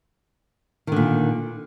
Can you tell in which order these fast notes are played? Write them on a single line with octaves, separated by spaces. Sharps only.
D#3 D3 A#2